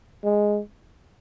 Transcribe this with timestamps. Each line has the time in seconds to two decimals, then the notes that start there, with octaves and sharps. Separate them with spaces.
0.24 G#3